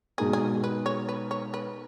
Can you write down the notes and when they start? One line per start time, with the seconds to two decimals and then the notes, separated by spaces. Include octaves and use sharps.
0.18 B2 G#3 D#4 G#4 A#4
0.33 G#4
0.64 B4
0.86 C#5
1.09 B4
1.31 C#5
1.54 B4